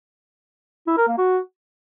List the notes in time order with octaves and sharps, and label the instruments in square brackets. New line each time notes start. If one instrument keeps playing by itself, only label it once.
[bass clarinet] E4
A#4
A#3
F#4